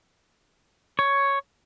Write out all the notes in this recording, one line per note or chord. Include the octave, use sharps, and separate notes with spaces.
C#5